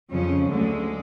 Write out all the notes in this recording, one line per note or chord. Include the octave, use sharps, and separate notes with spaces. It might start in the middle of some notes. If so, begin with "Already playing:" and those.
F2 C#3 F3 C#4
D2 D3 F#3 G#3